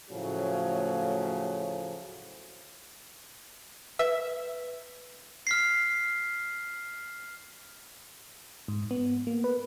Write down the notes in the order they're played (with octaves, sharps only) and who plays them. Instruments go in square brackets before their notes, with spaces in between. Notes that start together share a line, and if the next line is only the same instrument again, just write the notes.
[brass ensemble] A2 C#3 F3 F#3 A3
[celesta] B4 [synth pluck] E5
[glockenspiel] F6 B6 C7
[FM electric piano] G#2
B3
A#3
B4